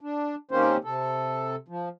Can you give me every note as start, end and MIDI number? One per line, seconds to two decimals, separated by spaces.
0.01 0.35 62
0.51 0.77 51
0.51 0.77 58
0.51 0.77 60
0.51 0.77 61
0.51 0.77 67
0.51 0.77 72
0.84 1.56 48
0.84 1.56 69
1.68 1.89 53